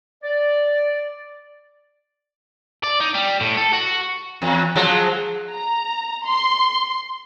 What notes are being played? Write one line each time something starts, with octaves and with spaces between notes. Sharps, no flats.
D5
D5
D#4
G3
A2
A4
F#4
E2
F3 F#3 G#3
A#5
C6